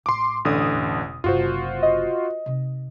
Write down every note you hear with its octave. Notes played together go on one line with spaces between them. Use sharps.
A1 C6 D6
E1 A1 D3 D#6
E1
F#1 C3 F4 F#4 C5
D#5
C3 D#4